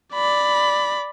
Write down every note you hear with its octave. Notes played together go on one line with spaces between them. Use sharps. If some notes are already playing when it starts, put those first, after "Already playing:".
D5 B5